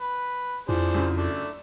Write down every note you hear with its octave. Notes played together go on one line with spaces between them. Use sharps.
B4
F2 D4 E4 F4 G#4 C5
F#2 C#3
A3 D4